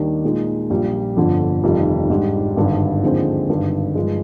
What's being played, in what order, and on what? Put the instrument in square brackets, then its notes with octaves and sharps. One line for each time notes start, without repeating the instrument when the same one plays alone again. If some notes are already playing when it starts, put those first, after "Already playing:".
Already playing: [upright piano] D#2 D#3 G3 D4
A#2 G#3 D#4
A#1 A#2 G3
G1 F2 D3 F3
F1 F2 D#3 G3
G#2 G3 D4
G#1 G2 D3
D#2 D3 F3 G#3 C4
G#1 G2 D3
G2 F3 G#3